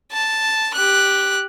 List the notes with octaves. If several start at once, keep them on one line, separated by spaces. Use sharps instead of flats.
A5
G4 F#6